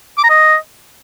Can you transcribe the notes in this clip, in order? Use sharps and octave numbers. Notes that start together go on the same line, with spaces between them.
D6
A#5
D#5